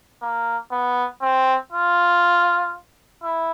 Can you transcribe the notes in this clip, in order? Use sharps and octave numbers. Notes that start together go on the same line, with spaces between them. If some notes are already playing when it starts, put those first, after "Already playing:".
A#3
B3
C4
F4
E4